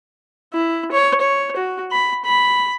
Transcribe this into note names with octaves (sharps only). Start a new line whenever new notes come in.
E4
C#5
C#5
F#4
B5
B5